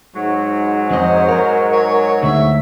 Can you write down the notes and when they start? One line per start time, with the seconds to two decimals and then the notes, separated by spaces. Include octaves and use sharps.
0.14 G#2 F#3
0.91 F2 C5 D#5
1.28 A#4
1.72 C#5
2.23 D2 E5